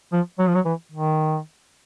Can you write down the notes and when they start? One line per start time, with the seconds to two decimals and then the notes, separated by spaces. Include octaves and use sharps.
0.12 F3
0.39 F#3
0.48 F3
0.55 F#3
0.65 E3
0.92 D#3